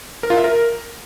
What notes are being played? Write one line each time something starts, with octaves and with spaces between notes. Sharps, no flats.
A#4
F4
E5
A#4